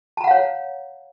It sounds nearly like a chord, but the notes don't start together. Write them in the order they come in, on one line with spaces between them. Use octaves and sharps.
A5 A#5 F#5 F5 C#5